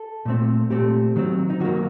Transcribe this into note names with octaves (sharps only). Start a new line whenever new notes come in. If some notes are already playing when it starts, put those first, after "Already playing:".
Already playing: A4
A#2 A3 C4
A#2 A3 C4 G4
D#3 F#3 C4
D#4
D#3 F#3 A#3 F#4